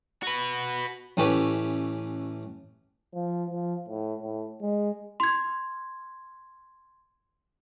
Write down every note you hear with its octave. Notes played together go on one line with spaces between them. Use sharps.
F#4 B4
A1 E3 A3 C#4 G4 B4
F3
F3
A2
A2
G#3
C6 G#6